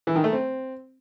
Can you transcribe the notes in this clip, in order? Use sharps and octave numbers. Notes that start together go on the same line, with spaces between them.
E3
D#3
A3
C4